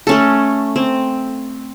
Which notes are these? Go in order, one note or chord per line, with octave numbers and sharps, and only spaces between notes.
A3 C#4 A4
C4